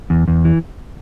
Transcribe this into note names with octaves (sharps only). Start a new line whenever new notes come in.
E2
E2
E3